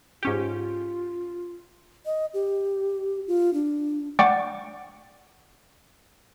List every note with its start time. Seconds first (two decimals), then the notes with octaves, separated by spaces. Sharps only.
0.23 G#2 C#4 F4 G4
2.06 D#5
2.34 G4
3.27 F4
3.54 D4
4.19 D5 F#5 G5 C#6 D6 A6